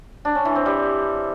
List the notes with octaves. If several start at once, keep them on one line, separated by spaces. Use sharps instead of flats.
D4
C#4
E3
C4
G3